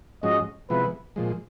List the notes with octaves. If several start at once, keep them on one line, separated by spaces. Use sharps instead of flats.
G#2 F3 G#3 C#4 F#4 D#5
C3 F3 G#3 B3 E4 B4
A#2 F3 G#3